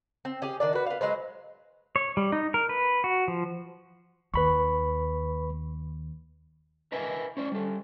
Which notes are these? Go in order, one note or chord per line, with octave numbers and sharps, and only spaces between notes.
C4
C#4 G4 G#4
D#3 D4 D5
F#4 B4
B3 F5
F#3 G#3 B4 C5
C#5
G3
D#4
A#4
B4
F#4
F3
D#2 B4 B5 C#6
A#4 B4 D#5 E5 G#5
C#4 C5 D5
G3 A4